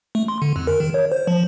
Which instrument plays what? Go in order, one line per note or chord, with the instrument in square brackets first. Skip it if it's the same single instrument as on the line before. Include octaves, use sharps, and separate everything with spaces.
[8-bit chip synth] A3
C6
D3
F2
A#4
D#3
C#5
C5
F3